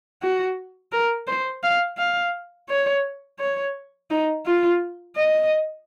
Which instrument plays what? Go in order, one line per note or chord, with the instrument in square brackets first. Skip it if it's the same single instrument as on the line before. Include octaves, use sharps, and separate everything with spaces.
[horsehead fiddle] F#4
A#4
C5
F5
F5
C#5
C#5
D#4
F4
D#5